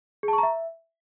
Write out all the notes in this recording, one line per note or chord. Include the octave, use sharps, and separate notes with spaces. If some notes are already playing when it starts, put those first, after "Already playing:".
G#4
A5
C#6
A#5
E5